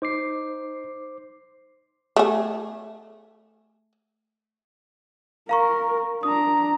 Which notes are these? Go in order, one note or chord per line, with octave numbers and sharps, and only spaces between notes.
D#4 C5 D6 C7
A3 G#4
A#4 F5 A#5 C#6
D4 A#5 D#6